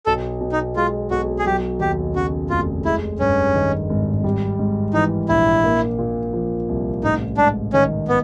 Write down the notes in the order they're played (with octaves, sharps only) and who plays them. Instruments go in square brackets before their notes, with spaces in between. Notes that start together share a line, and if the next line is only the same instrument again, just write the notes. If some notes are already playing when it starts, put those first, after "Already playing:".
[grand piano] B1 [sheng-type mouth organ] A4
[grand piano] B2
[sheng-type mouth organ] D#4
[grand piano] G#3 [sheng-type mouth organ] F4
[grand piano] B1 [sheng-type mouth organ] F#4
[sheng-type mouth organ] G#4
[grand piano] F#3 [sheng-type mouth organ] G4
[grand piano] D#2 [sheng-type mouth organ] G4
[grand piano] C#3 [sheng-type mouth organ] F#4
[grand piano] F1 [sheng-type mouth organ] F4
[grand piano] G#3 [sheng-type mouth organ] E4
[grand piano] G2 [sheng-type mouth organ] C#4
[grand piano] D#3
G#1
G3
G#2
[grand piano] E3 [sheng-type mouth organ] D#4
[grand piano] A#1 [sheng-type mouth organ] E4
[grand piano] A#3
A#2
F3
C2
[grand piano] A1 [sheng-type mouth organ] D#4
[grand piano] G#2 [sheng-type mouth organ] D4
[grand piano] D#3 [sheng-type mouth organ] C#4
[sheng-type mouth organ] B3